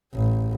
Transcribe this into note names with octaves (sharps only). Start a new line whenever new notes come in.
A1